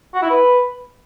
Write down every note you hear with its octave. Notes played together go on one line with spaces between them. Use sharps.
F#4
E4
B4